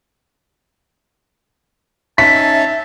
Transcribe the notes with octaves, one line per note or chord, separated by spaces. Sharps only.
C#4 D#4 E5 A5 B6